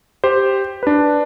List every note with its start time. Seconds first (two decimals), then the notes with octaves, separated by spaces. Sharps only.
0.24 G4 C5
0.83 D4 B4